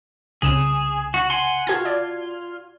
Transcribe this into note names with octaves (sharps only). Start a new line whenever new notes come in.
C2 C#3 G#4 E7
F#4
F#5 G#5 C6
F4 F#4 A5 G#6
D5